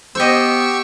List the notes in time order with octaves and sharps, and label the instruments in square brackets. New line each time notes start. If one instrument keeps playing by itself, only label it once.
[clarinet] B3 [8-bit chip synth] G4 C#6 E6 [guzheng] C5 D#5